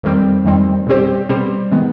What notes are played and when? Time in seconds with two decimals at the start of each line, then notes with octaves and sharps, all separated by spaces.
0.03 F2 D#3 G3 C4
0.45 F2 D#3 G3 C4
0.87 B2 G3 C4 G4 C5
1.29 B2 G3 C4 G4 C5
1.72 D#3 G#3 B3